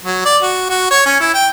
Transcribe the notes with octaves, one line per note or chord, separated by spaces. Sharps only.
F#3
D5
F#4
F#4
C#5
C#4
E4
G5